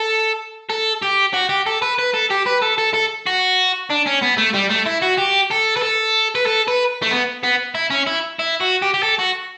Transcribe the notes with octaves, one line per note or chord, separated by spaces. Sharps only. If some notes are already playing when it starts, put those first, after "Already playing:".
Already playing: A4
A4
G4
F#4
G4
A4
B4
B4
A4
G4
B4
A4
A4
A4
F#4
D4
C#4
B3
A3
G3
A3
E4
F#4
G4
A4
B4
A4
B4
A4
B4
A3
B3
B3
E4
C#4
E4
E4
F#4
G4
G4
A4
F#4